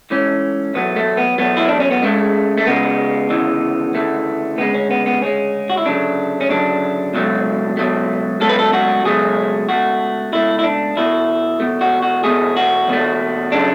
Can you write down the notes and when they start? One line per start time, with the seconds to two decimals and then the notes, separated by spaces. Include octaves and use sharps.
0.10 G#2 E3 A3 C#4
0.74 E2 B2 F#3 A3 B3
0.96 A3
1.17 B3
1.38 E2 B2 F#3 A3 B3
1.57 E4
1.69 D4
1.80 C#4
1.91 B3
2.02 C#2 C#3 G#3 A3
2.58 A3
2.66 C#2 C#3 G#3 B3
3.30 D2 C#3 E3
3.94 D2 C#3 E3 A3
4.58 D2 C#3 G#3 B3
4.74 C#4
4.90 B3
5.06 B3
5.21 D2 C#3 G#3 C#4
5.70 F#4
5.77 E4
5.85 D2 C#3 F#3 A3 D4
6.41 C#4
6.49 D2 C#3 F#3 A3 D4
7.14 C#2 B2 F#3 A3
7.77 C#2 B2 F#3 A3
8.40 C#2 B2 F#3 A3 A4
8.49 B4
8.59 A4
8.73 F#4
9.04 C#2 B2 F#3 A3 G#4
9.69 C#2 B2 A3 F#4
10.33 C#2 B2 A3 E4
10.59 E4
10.64 D4
10.96 E2 B2 A3 E4
11.60 E2 B2 A3
11.81 F#4
12.03 F#4
12.24 E2 B2 A3 G#4
12.56 F#4
12.88 E2 B2 A3
13.52 C#3 F#3 A3 D4